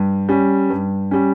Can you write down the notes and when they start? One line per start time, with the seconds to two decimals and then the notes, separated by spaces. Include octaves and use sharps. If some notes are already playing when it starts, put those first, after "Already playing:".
Already playing: G2
0.29 G3 C#4
0.70 G2
1.11 G3 C#4